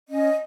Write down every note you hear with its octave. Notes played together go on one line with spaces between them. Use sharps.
C#4 D#5